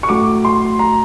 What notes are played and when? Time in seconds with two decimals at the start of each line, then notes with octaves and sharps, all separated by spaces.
0.03 C#6
0.09 A2 F#3 A3 D6
0.45 C6
0.79 A#5